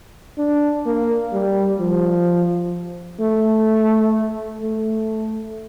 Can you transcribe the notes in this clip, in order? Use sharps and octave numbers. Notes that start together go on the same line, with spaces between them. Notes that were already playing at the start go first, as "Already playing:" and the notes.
D4
A#3
G3
F3
A3
A3